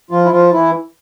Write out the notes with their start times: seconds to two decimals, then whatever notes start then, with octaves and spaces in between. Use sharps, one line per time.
0.11 F3 F4
0.25 E4
0.31 F3 F4
0.52 E3 E4